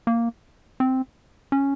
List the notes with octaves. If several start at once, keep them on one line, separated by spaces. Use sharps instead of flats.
A#3
C4
C#4